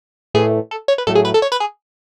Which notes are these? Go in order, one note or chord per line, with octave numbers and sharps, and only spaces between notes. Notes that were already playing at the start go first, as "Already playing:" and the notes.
A2 E3 A3 G#4
A4
C#5
B4
A2 F#3 A3 A4
G#4
B4
A4
C#5
B4
G#4